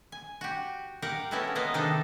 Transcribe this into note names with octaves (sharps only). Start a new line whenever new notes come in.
G#5
F#4 G4
G4 A#4 F5 F#5
B3 C#4 E4 F#4 A4
G#3 A#3 B3 B4 D#5 F5
C3 D#3 D4 D#4 A4